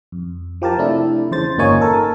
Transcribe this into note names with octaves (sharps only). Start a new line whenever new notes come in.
F2
F3 G4 A#4 A5
C3 A3 D4 E4
E2 C#3 C5 A6
G1 A#2 A#3 D#4 C#5 G#5
A4 A#4 A5